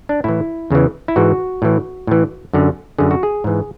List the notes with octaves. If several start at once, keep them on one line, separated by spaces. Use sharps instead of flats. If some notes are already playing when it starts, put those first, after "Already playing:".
D4
A2 E3 E4
E2 C#3 E3
E4
G#2 E3 F#4
A2 E3
A2 E3
F#2 D3
F#2 D3 G#4
F#4
G#4
G#2 E3